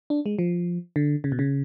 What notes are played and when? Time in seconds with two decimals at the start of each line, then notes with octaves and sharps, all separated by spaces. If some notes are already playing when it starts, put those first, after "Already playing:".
0.10 D4
0.26 G#3
0.39 F3
0.96 D3
1.24 C#3
1.32 B2
1.39 C#3